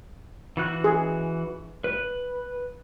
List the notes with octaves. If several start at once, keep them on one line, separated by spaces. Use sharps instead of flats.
E3 F#4 F#6
G#4
B4